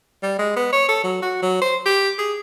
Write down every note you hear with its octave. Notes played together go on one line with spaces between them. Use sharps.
G3
G#3
B3
C#5
A4
F#3
F#4
F#3
C5
G4
G#4